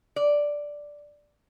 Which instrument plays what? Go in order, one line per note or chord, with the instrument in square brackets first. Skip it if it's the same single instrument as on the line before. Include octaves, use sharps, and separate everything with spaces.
[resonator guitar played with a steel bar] D5